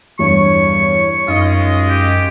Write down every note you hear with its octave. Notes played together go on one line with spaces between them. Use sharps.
E2 G2 C#5 C#6
F#2 G#3 D#4 F4 D#5
G4